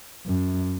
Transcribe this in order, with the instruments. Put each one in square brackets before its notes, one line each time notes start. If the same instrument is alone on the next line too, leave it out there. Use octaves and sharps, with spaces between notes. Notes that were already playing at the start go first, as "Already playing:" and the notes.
[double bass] F#2